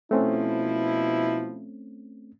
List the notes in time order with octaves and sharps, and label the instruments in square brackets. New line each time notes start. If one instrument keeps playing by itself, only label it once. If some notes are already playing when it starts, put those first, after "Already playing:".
[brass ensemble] B2 F3 E4 [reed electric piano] A3 C4 C#4